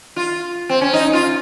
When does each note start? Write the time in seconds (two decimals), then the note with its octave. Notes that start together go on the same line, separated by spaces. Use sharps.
0.16 F4
0.69 C4
0.81 C#4
0.93 D#4
1.13 F4